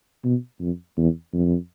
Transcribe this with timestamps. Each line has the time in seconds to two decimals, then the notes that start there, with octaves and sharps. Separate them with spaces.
0.24 B2
0.60 F2
0.97 E2
1.33 F2